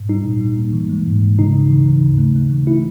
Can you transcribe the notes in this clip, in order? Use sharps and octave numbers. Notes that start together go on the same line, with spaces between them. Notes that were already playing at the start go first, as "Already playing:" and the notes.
Already playing: G#2
G3 D#4
A#2
G3
A#3
E3
G#3
G#2
G#2
C#3 D#4
C#3
E3
D2
C#3
A3
A3
E3
A3 E4